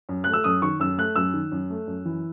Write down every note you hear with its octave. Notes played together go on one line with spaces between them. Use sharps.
F#2
A3 F#6
E6
F#2 D#6
D#3 C#6
F#2 E6
A3 F#6
F#2 E6
D#3
F#2
A3
F#2
E3